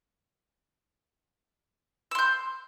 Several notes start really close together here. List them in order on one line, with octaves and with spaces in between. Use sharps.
E6 C6 G6